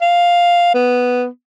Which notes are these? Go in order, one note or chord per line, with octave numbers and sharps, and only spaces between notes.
F5
B3